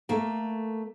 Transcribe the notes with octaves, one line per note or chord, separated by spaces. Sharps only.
A3 A#3